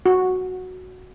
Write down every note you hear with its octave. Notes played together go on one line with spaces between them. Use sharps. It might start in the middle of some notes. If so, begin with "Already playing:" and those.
F#4